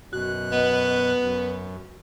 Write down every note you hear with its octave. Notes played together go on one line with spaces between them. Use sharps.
F#2 B2 F#4 F#6
B3 D#5
F#2